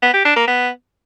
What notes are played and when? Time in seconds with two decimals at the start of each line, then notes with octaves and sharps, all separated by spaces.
0.02 B3
0.14 G4
0.25 D4
0.36 A#3
0.47 B3